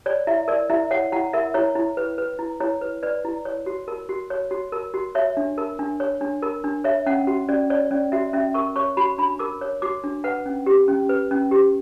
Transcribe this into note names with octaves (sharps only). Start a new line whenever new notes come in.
C#5 D5
E4 E5
A#4 D5
E4 E5
C#5 F#5
E4 F#5
A#4 E5
E4 C#5
E4
B4
B4
E4
E4 C#5
B4
B4 D5
E4
C#5
F#4
A#4
F#4
C#5
F#4
A#4
F#4
C#5 E5
D4
A#4
D4
C#5
D4
A#4
D4
C#5 E5
C#4 F#5
F#4
C#4 D5
C#5 D5
C#4 D5
F#4 E5
C#4 E5
A#4 C#6
C#5 C#6
F#4 B5
D4 B5
A#4 D6
C#5
F#4 D6
D4
B4 F#5
C#4
G4
C#4
B4
C#4
G4